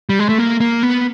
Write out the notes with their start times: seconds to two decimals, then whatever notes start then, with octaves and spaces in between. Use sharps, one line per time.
0.09 G3
0.19 G#3
0.29 A3
0.38 A#3
0.60 A#3
0.83 B3